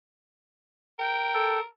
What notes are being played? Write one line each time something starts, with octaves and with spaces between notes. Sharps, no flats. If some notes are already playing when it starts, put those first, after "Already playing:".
A#4 G5
A4